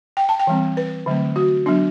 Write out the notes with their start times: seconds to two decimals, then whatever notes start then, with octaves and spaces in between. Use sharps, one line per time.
0.17 G5
0.29 A5
0.39 G5
0.47 E3 G3 C4
0.77 B4
1.06 D3 F#3 A3 C4
1.36 F#4
1.66 F#3 B3 D4